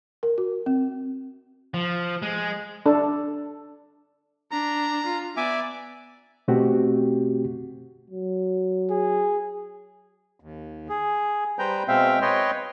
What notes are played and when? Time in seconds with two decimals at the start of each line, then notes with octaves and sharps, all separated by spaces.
0.23 A#4
0.38 F#4
0.66 C4
1.74 F3
2.22 G#3
2.86 D4 A4
4.52 D4 A#5
5.06 F4
5.37 B3 D5 E5 G#5 D6
6.48 B2 A3 C4 F#4 G4
8.10 F#3
8.90 G#4
10.40 D#2
10.89 G#4
11.59 G3 B4 C5 G5 A#5 G6
11.88 B2 G#3 C4 E5 F5 G5
12.22 B4 C#5 D#5 G5 C6